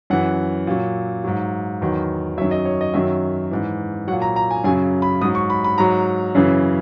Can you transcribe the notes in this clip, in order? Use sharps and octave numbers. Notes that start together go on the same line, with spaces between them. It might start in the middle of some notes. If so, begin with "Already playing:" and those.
F#2 E3 F#5
A#2 F#3
G#2 F#3
E2 D#3 F#3
F#2 D#3 F#3 E5
D#5
C#5
D#5
F#2 D#3 F#3 E5
G#2 E3
A#2 F#3 F#5
A#5
A#5
G#5
F#2 C#3 F#3 G#5
B5
G#2 F#3 D#6
C#6
B5
B5
G#2 F#3 A#5
F#2 C#3 E3